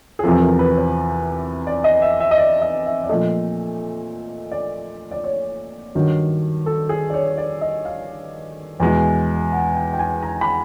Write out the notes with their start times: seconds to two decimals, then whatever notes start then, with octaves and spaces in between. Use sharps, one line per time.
0.19 G#4
0.24 E2 C3 F3 A4
0.42 A#4
0.59 B4
0.77 C5
1.67 D5
1.84 D#5
2.02 E5
2.20 E5
2.31 D#5
2.38 D5
2.62 D#5
2.86 E5
3.04 D5
3.09 A#2 F3 A3 D#5
4.52 D5
5.11 D5
5.24 C#5
5.95 G2 D#3 F#3
6.66 A4
6.89 G#4
7.10 D5
7.14 C#5
7.38 D5
7.61 D#5
7.85 F5
8.80 E2 B2 G#3
9.52 F#5
9.75 G5
9.93 G5
9.99 G#5
10.23 A#5
10.41 B5